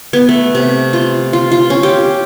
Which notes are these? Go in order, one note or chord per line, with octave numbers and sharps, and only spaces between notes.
B3
A3
C3
F4
F4
F4
C#4
G4